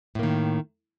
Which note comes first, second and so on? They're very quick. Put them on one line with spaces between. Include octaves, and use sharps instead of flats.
A2 A#3 D#3